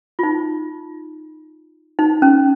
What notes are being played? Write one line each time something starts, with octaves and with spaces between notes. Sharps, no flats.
F4
D#4
D#4
C#4